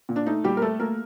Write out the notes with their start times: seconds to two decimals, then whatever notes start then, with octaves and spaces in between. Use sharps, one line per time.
0.09 A#2
0.16 D4
0.26 A3 D#4
0.44 A#2 G3 G4
0.57 A#4
0.62 A3 A4
0.80 A3 A#3 A#4